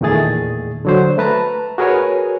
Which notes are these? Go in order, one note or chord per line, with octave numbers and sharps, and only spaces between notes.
E2 A#2 D#3 A3 G#4 A6
D3 F#3 C5
A3 B4 A5 A#5
F#4 G#4 A#4 B4 C#5 G#5